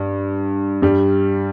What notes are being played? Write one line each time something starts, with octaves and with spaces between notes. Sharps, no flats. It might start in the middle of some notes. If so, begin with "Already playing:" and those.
Already playing: G2
G2 G3